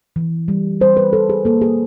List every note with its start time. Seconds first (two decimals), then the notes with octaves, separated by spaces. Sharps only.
0.16 E3
0.48 G3
0.81 G3 C5
0.97 B4
1.13 E3 A4
1.30 G#4
1.45 A#3 A4
1.61 G#4